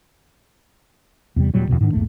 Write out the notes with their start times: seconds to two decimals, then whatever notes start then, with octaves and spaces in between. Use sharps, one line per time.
1.36 E2 C3 G3
1.54 D#1 A#2 F#3 G3
1.68 E2 G#2 B2 D3
1.81 G#2 D#3 D4
1.93 A#1 E2 G#2 A3